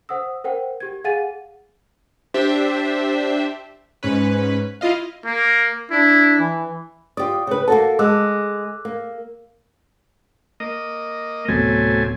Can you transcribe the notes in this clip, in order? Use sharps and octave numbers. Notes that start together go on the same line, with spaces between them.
C5 F#5 D#6 E6
A#4 C5 F#5 G5
G4 G#6
G#4 F5 F#5 G#5 A6 D#7
D4 G4 C5 E5
G#2 C#4 B4
E4 F4 D#5 F5
A#3
D4 E4
E3
F4 G4 D5 D#6
C#3 B4
A#3 F#4 A4 A5
G#3 D6 E6 F#6
A#3
A#3 D#5
D1 C3 F#3 A3 B3 G#5